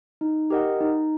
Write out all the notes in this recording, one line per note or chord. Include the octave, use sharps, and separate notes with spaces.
D#4
G4 A#4 D#5 F#5
D#4